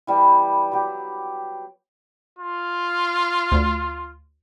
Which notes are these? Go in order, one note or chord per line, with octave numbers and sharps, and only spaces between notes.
E3 G3 B3
F#3 G4
F4
D2